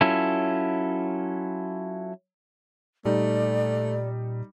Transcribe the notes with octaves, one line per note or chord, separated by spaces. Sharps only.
F#3 C#4 E4 F4 A4
A#2 G3 A3 D#4 D5